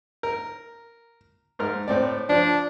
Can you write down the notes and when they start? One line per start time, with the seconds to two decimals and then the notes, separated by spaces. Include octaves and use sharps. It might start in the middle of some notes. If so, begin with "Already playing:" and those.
0.23 A#4
1.59 G#2 A#4 F6
1.88 A2 C4 D5
2.29 F3 D4